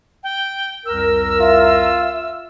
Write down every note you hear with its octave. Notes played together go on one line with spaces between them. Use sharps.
G5
C2 F2 A#4 E6
F4 E5